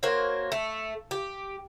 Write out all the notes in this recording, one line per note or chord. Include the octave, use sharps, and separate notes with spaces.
A#3 F#4 C5 C#5
A3
G4